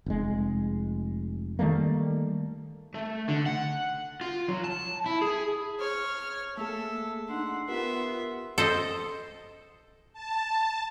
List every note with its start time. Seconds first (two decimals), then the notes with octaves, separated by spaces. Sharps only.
0.06 F1 G#3
1.59 D#3 G3 A3 A#3
2.94 A3
3.29 D3
3.47 F#5
4.21 F4
4.49 F#3
4.64 A5
5.06 E4
5.21 G#4
5.79 C#5 F6
6.58 A3 A#3 G#4 A4 E5
7.29 D4 D#4 F#5 C6
7.68 B3 F4 G4 A#4 E5
8.58 A4 C5 D#5
10.13 A5